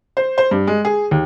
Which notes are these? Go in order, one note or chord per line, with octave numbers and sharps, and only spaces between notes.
C5
C5
G2
G#3
G#4
D#2